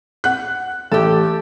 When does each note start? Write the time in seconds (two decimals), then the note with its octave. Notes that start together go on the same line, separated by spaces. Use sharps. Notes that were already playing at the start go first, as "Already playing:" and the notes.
0.24 F#5 F#6
0.92 A1 G4 A4